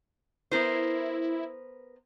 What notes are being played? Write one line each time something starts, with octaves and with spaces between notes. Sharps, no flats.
B3 E4 A#4 C5